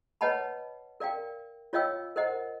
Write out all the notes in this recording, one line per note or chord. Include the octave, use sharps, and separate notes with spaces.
B4 C#5 D#5 F#5 A5 B5
A#4 D5 F5 G5
F4 C#5 D#5 F5 G5 E6
A#4 C5 D#5 F#5